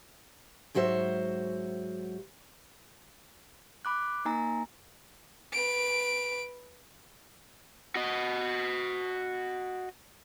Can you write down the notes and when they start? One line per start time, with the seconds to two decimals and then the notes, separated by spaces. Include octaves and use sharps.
0.74 G#2 F#3 F#4 C5 E5
3.85 B5 D6 F#6
4.25 A#3 D#4 G#5 A#5
5.53 B4 D7
7.96 F#4 D#5